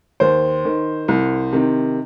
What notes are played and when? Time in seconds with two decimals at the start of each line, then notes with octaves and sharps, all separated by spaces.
0.20 D#2 C5
0.65 D#3
1.08 C2
1.52 C3 D#3